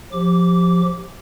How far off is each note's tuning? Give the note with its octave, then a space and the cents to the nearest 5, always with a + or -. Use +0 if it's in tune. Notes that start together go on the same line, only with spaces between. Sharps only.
F3 +20 G4 +0 D6 -20